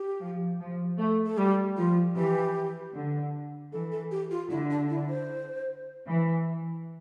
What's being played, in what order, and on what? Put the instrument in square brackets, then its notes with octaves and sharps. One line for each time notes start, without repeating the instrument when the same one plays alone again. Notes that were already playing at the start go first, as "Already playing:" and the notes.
Already playing: [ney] G4
[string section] F3
F3
A3
[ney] A4
[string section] G3 [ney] G4
[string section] F3 [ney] F4
[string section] E3 [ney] G4
[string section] D3
[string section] E3 [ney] A4
[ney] A4
G4
F4
[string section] D3 [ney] E4
[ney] D4
E4
C5
[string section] E3